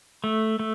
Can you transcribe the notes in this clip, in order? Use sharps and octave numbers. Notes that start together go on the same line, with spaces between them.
A3
A3